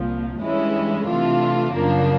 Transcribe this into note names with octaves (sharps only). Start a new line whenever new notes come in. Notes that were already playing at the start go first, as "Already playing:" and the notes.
Already playing: C2 A#2 F3
G2 E3 G#3 C#4 E4
C3 E3 A3 D4 F4
F#2 C#3 F3 A#3 D4